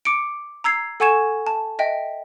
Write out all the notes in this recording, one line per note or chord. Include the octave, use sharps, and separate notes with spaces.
D6 C#7 D7
A#5 E6 G#6 C7
A4 F#5 G#5 C#6 G#6 E7
A5
D#5 E5 G5